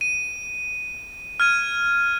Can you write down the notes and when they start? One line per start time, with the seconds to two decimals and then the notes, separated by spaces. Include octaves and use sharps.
0.01 D#7
1.40 F6 G#6 D#7